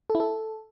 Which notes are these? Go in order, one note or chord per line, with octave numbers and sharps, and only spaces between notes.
A4
E4
A4